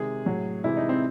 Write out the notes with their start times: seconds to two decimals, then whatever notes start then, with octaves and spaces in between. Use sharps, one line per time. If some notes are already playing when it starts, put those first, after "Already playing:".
Already playing: C3 D#3 G#3 G#4
0.26 A2 F#3
0.64 C3 E3 G#3 E4
0.77 D#4
0.89 C4